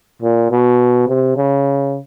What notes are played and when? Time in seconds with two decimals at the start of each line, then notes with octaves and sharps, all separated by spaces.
0.22 A#2
0.50 B2
1.08 C3
1.36 C#3